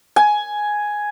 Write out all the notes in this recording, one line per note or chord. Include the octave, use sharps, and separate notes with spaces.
G#5